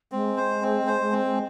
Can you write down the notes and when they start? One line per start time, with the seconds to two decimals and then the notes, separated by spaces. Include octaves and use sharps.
0.12 G#3 C4
0.37 C5
0.62 C4
0.87 C5
1.12 C4